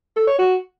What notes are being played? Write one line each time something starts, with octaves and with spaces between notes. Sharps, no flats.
A4
C#5
F#4